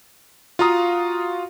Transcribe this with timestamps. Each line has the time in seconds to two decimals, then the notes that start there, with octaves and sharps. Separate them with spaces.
0.59 F4 F#4 F5 A#5 D#6